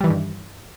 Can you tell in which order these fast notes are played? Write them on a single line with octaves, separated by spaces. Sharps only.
G3 E3 D#3 G2